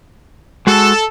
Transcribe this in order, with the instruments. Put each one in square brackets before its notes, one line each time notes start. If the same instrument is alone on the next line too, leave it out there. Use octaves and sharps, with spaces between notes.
[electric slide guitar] G#3 F#4 [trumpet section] A4